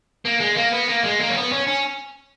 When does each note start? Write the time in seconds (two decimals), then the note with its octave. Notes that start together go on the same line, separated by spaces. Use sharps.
0.25 A#3
0.40 G#3
0.56 A#3
0.72 B3
0.88 A#3
1.04 G#3
1.20 A#3
1.29 C#4
1.36 B3
1.52 C#4
1.67 C#4